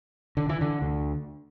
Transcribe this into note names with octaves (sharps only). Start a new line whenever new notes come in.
D3
E3
D3
D2 D3